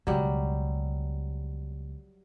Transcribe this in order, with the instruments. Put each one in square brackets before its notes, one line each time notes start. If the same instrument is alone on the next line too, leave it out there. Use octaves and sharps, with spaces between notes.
[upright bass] C#2 B2 [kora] F#3 G3